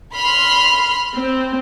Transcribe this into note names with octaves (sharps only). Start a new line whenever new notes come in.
B5 C6 F6
C4